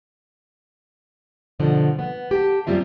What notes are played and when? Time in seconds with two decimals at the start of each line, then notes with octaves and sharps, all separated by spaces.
1.59 G2 B2 D3 F3
1.99 B3
2.31 G4 A5
2.67 F#2 F#3 G3 C4 F4 E5